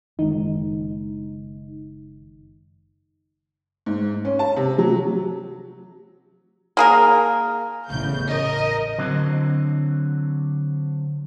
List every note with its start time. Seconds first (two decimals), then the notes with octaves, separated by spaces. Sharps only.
0.19 F#1 D#3 G#3 D#4
3.86 G#2
4.25 C#4
4.39 A5
4.56 C3
4.78 F#3
6.77 A#3 G#4 A#4
7.89 A1 E2 C#3 G6
8.28 A#4 D#5
8.98 D3 F#3 C4